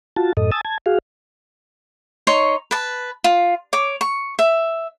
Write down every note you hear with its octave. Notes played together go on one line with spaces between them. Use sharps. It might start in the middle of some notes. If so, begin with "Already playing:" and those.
F4 F#4 A5
F#2 A2 A4 D#5
G#5 A5 D#6 E6 A6
A5 G#6
F#4 G#4 F5
D#4 C#5 C6 C#6
B4 A5
F4
C#5 D6
C#6
E5